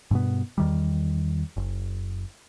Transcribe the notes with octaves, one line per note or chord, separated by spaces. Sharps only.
G2 B2 B3
E2 D#3 G3
F#1